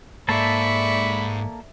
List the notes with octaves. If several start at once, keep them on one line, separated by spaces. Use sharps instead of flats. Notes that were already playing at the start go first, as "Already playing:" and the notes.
G#2 A#3 A4 D5 E5 A5 B5 C#6